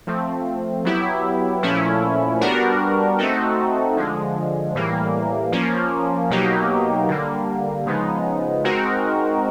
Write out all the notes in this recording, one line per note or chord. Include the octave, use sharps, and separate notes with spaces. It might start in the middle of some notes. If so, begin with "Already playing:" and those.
F3 A3 C4
F#3 B3 E4 G4
A#2 F3 A3 C#4 E4
G3 B3 D4 F#4 A#4
A3 C4 D#4 F#4 A4
D3 F3 G#3
A2 E3 G3 A#3
F3 A#3 C#4
B2 F#3 A#3 D#4 G4
D3 G3 A#3
C#3 F3 G#3 B3 D#4
G#3 C4 D#4 F#4 A#4